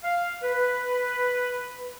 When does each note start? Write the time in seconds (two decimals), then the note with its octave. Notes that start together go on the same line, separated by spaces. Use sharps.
0.02 F5
0.42 B4